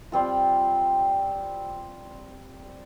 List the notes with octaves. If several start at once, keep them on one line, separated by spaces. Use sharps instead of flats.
G3 C4 F4